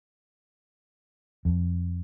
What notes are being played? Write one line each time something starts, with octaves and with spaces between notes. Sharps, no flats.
F2